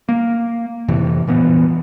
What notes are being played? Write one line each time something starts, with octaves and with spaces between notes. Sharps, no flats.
A#3
F2 A2 C3 E3
A#2 E3 B3